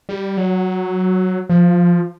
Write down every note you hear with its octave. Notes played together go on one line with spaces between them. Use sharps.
G3
F#3
F3